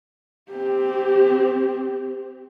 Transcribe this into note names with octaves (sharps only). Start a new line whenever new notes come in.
C4 G4